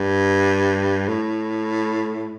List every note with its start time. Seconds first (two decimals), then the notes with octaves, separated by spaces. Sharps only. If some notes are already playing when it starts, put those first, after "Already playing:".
Already playing: G2
1.08 A2